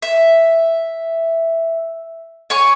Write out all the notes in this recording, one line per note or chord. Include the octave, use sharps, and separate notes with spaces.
E5
C#5 G#5 C#6 D6